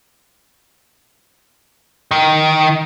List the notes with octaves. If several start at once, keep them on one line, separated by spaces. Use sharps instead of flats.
D#3